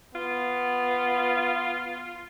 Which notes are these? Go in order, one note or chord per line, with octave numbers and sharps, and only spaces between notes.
B3 F4